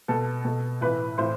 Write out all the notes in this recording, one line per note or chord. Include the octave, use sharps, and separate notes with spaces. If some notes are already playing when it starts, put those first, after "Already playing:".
B2 A4
B2 A4
A2 E3 B4
A2 E3 C5